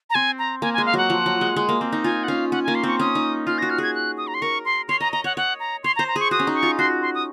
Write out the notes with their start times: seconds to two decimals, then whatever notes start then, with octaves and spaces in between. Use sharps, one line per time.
0.10 A#5
0.15 C4 G#5
0.39 A#5
0.62 A#3 G#5
0.74 G#5
0.78 G#3
0.86 F5
0.94 F#3 F#5
1.10 F3
1.26 F#3
1.41 G#3
1.56 G#3
1.69 A#3
1.81 C4
1.92 D#4
2.04 F4 G#5
2.24 F#5
2.28 C#4 F5
2.51 C#4 F#5
2.64 G#5
2.68 A#3
2.75 C6
2.83 C4 C#6
3.00 C#4 D#6
3.15 D#4
3.47 F4 F6
3.58 A#6
3.62 F#4
3.70 F6
3.78 G#4 G#6
3.95 F#6
4.18 D#6
4.27 A#5
4.34 C6
4.42 A#4 C#6
4.65 C6
4.88 C#5 C6
5.00 D#5 A#5
5.13 D#5 A#5
5.24 C#5 F#5
5.37 C#5 F#5
5.60 A#5
5.84 C#5 C6
5.96 A#5
5.99 C5
6.08 A#5
6.16 G#4 C#6
6.31 F#4 D#6
6.39 C#4
6.47 D#4
6.55 C#6
6.63 F4
6.78 F#4 C6
7.02 C6
7.15 D#6